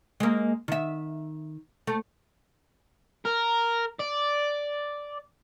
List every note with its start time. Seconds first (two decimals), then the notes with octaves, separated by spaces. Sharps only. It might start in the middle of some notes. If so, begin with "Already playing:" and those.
0.20 G#3 A#3
0.68 D#3 E5
1.87 A3
3.25 A#4
3.99 D5